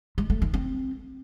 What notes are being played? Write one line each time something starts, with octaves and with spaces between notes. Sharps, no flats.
G#3
A3
D#3
C4